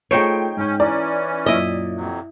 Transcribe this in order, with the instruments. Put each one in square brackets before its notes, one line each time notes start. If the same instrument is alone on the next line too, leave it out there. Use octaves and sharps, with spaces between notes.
[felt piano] A3 F4 G#4 [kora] D#4 C5 C#5 [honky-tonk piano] G5 D7
[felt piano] G#2 G6 [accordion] C#4
[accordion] E3 C#4 [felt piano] E4 G#5 A#5 [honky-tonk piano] D5
[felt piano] F#2 A#2 [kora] E4 D#5
[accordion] F2 C3 F#3